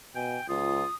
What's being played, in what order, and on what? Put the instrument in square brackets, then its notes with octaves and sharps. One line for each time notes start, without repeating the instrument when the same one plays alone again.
[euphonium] B2 [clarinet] G5 [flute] G#5
[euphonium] C#2 [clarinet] F4 [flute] D#6